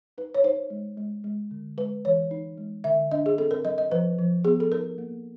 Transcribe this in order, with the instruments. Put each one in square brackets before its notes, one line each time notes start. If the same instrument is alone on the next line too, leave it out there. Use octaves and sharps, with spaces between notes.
[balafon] D#4 B4
C#5
D#4 C5
G#3
G#3
G#3
D3
G#3 B4
E3 C#5
D#4
G#3
D3 E5
D4 D#5
G#4
C4 A4
A#4
F#3 D#5
D#5
F3 B4
F3
B3 G#4
A4
D#4 A#4
A#3